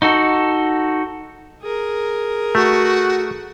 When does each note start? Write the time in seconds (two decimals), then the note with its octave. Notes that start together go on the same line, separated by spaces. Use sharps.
0.02 D#4 F#4 A4
1.62 G#4 A#4
2.55 A3 F#4